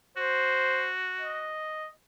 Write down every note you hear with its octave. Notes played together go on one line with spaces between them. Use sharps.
F#4 C5
D#5